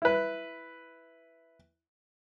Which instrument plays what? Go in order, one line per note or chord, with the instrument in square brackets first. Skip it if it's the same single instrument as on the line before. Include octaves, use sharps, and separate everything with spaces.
[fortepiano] E4 B4